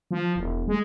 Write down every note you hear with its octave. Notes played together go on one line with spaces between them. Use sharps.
F3
E1
G#3